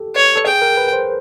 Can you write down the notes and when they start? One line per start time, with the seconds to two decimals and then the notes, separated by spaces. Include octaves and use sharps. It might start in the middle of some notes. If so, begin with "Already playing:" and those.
Already playing: G4 A4
0.15 C#5
0.36 A4
0.46 G#4 G5
0.62 A#4
0.77 B4
0.93 C5